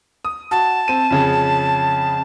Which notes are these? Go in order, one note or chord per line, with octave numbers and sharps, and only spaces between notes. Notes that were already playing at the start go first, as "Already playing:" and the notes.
D#6
F#4 A5
C4 D#7
F2 C#3 G#4